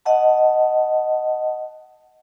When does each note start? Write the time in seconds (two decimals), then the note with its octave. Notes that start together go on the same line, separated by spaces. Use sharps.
0.06 D#5 F#5 A5